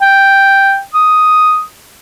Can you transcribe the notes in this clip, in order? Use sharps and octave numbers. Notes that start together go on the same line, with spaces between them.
G5
D#6